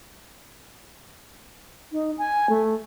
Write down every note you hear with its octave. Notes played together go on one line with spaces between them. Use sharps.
D#4
G#5
A3